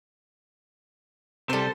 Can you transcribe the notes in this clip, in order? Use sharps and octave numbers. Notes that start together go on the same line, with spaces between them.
C3 G3 A4 C5